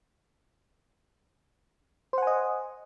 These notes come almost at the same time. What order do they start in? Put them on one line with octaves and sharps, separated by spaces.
C5 F#5 G#5 D#5